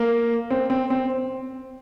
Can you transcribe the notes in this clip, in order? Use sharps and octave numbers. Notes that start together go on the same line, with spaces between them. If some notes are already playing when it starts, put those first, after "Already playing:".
Already playing: A#3
C4
C4
C4